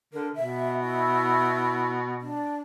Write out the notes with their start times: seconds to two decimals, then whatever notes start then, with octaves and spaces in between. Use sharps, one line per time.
0.13 D3 A#4
0.36 B2 E5
0.82 E4
2.21 D4